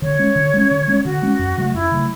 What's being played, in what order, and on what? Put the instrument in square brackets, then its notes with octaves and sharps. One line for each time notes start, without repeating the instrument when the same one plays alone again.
[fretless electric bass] D3 [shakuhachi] C#5
[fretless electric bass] G#3 C#4
D3
G#3 C#4
D3
G#3 C#4
[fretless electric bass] D3 [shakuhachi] F#4
[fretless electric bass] G#3 C#4
F#2
C#3 F#3 A3
[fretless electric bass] F#2 [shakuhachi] E4
[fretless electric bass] C#3 F#3 A3